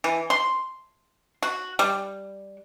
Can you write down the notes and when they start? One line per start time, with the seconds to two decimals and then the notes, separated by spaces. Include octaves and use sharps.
0.04 E3
0.30 C6
1.42 F#4
1.79 G3